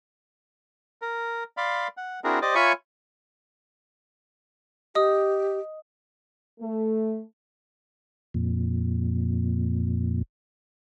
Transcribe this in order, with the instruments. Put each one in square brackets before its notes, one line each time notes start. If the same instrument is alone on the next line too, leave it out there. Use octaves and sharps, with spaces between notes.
[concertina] A#4
D5 F5 B5 C6
F#5
C4 D4 E4 F#4 G#4 A#4
G4 C5 D5 D#5
F4 C#5 E5 G#5 B5 C#6
[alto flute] G4 [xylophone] D#5 D#6
[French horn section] A3
[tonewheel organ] F2 A#2